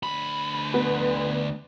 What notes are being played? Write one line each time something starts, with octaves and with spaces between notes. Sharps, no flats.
D2 B5
B3